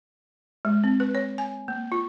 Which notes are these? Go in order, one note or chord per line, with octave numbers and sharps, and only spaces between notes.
G#3
C4
B4
C#5
G#5
A#3
F4